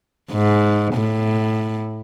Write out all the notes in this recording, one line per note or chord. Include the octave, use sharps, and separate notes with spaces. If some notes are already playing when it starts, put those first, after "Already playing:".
G#2
A2